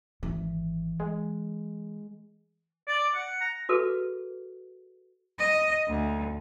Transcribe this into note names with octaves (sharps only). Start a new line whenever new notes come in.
G#1 E3
G#3
D5
F#5
A#5
F#4 G#4 A4 B4
D#5
D2